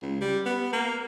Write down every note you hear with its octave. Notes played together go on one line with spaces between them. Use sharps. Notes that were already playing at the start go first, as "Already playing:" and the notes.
C#2
G3
B3
A#3